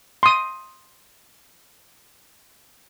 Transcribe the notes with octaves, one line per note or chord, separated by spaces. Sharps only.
C6 D#6